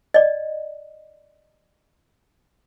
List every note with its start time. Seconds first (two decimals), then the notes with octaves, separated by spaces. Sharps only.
0.14 D5 D#5